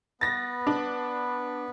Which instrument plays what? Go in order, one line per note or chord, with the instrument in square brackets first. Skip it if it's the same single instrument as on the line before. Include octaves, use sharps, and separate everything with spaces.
[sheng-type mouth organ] B3 B4 [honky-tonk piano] A6 A#6
[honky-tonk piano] D4